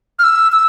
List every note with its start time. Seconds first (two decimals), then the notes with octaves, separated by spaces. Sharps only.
0.19 F6
0.24 E6
0.52 E6